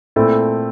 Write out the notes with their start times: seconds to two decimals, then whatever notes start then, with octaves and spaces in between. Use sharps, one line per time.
0.16 A#2 A3 C4 E4 A4